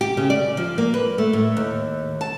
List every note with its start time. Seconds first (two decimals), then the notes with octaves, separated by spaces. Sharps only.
0.01 G4
0.17 C#3
0.30 D5
0.57 F3
0.78 A#3
0.94 B4
1.18 A3
1.33 A2
1.57 D#2
2.21 A5